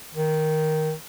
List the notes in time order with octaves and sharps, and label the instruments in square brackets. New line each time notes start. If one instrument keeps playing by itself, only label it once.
[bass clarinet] D#3